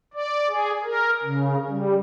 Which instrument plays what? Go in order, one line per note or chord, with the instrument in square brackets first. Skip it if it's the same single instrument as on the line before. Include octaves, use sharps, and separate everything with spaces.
[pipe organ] D5
G#4
A#4
C#3
G3